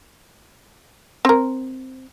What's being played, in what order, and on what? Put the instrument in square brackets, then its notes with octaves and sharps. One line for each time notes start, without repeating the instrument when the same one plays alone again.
[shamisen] C4 A#4